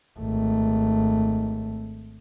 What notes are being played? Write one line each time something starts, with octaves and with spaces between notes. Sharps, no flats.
G#1 A3